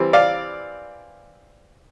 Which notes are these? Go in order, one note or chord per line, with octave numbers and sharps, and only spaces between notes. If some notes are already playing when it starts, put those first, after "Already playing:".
Already playing: E3 G3 C4
D5 F5